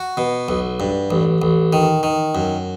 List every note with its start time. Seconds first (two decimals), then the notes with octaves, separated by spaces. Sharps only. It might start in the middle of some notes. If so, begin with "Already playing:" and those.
Already playing: F#4
0.17 B2
0.49 B1
0.80 G2
1.11 A1
1.42 A1
1.73 D#3
2.03 D#3
2.35 F#2